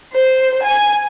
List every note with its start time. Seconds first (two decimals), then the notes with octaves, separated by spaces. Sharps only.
0.12 C5
0.62 G#5